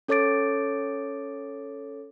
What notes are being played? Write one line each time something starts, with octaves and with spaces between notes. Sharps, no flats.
C#4 A4 C#5 D6 A6 D7